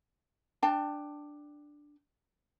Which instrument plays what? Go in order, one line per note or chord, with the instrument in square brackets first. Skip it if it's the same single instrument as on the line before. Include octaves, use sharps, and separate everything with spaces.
[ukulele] D4 G5 A5